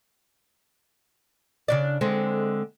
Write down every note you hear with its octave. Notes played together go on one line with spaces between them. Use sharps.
C#3 D4 D5
D3 G#3 C4